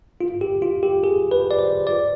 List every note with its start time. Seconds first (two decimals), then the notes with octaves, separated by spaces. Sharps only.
0.21 F4
0.41 G4
0.62 F4
0.83 G4
1.04 G#4
1.31 B4
1.51 D5
1.59 C5
1.87 D5